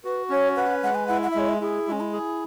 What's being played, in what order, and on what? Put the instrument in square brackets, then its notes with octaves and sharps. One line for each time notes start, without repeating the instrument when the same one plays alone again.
[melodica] F#4 [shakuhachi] B4
[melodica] C#4 [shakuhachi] C#5
[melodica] B4 [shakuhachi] F#5
[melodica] G#3 [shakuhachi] F#5
[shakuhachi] G#5
[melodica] E4 [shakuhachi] F#5
[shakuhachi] F#5
E5
[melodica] G#3 [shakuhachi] C#5
[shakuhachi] E5
[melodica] E4 [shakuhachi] G#4
[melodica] G#3 [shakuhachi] C#4
[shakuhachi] E4
[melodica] G#4